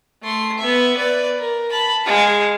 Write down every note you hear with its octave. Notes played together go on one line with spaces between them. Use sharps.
A3 C6
B3 E5
B4 D5
A#4
A5 B5
G#3 F5